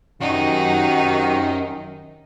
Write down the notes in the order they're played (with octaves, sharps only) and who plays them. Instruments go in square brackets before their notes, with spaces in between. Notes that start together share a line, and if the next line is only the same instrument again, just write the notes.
[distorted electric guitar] F#2 [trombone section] C3 D#3 [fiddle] D#4 [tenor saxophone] F#4